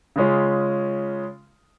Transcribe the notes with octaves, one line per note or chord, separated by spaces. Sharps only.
C#3 G#3 C#4 F4